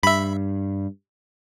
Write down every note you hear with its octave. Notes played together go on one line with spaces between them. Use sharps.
G2 E5 B5